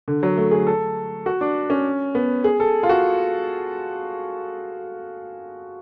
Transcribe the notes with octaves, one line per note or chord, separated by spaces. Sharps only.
D3
F#3
A3
G#4
A4
F#4
D4
C#4
B3
G#4
A4
F4
F#4